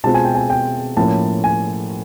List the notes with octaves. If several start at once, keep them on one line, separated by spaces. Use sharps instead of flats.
B2 G#3 C4 F4 A5
G#5
G5
G#5
G5
A2 F3 A#3 C#4 A5
G#5